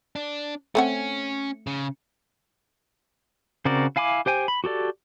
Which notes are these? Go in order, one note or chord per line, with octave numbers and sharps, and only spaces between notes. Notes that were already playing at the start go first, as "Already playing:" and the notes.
D4
A3 C4 C#4 F#5
C#3
C#3 C4 F#4 A#4 D5
E4 F5 G#5 B5 D6
G4 C5 G5 G#5
B5
F#4 G4 A4 D5